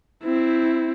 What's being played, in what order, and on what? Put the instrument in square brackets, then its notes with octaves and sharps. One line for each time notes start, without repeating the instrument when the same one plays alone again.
[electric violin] C4 E4